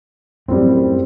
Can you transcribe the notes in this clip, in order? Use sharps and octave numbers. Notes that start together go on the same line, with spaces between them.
F#2 A2 G3 C4